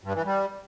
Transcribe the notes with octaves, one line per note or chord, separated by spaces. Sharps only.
G2
E3
G3